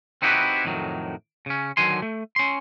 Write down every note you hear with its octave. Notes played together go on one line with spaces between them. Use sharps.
C4 D#4 E4 F#4 G4 B4
F2 A2 D#3 F#3
C#3 C#4
D3 D#3 F#3 G#5 C6
A3
C#4 C6